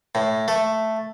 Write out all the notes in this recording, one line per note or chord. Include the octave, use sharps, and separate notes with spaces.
A2
A3